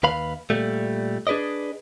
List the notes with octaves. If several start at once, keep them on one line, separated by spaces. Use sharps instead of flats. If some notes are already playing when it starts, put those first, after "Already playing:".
D#2 B4 F5 B5
A#2 G3 A3
D4 G#4 B4 D5 D#5